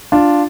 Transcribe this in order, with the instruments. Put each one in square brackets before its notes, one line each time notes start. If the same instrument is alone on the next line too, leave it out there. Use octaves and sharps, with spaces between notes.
[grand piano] D4 F4